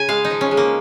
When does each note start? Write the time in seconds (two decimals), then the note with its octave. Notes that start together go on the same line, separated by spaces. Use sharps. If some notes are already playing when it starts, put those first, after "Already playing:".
Already playing: C#3 G#5
0.08 G#3 F5
0.25 D#4
0.31 F3
0.41 C#4
0.51 G#3
0.57 A#3